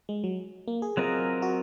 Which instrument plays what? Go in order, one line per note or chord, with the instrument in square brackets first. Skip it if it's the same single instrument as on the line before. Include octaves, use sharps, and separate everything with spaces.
[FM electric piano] G#3
F#3
A#3
G#4
[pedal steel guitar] F#3 C4 F4 A#4 D#5
[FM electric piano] F#4